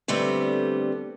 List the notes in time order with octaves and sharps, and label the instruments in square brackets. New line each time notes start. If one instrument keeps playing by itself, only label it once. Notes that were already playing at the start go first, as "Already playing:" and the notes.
[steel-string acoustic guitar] D3 G3 A3 B3 C4